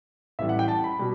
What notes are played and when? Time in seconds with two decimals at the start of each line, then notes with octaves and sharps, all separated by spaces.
0.39 A1 A2 E3 G3 E5
0.49 F#5
0.59 G5
0.68 A5
0.84 B5
0.99 B2 G3